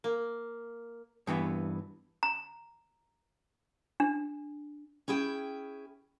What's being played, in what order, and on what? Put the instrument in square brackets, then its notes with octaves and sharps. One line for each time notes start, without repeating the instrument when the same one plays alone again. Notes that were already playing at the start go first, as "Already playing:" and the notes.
[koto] A#3
[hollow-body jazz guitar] G2 E3 B3 E5
[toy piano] A#5
D4
[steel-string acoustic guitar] C#4 E4 G#4 G5